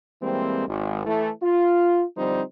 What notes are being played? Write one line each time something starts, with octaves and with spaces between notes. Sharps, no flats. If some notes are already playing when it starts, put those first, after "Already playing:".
E3 G3 G#3 A#3 C4
G#1
E3 A3
F4
D3 F3 G3 C4 D#4 C5